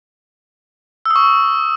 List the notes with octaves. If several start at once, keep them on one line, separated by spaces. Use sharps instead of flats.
E6
D#6
C#6